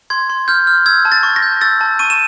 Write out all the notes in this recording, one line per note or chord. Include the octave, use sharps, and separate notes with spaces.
C6 G#6
C6
F6 G6
F6
E6 G#6
A5
A6
C#6
A#6
G6
E6 A6
A5
C#6 D#7
E7